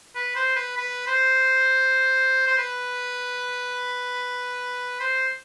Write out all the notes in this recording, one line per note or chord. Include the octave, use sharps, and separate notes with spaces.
B4
C5
B4
B4
C5
C5
B4
C5